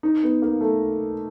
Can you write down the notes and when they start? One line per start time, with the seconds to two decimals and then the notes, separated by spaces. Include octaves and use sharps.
0.03 D#4
0.23 B3
0.42 A#3
0.61 A3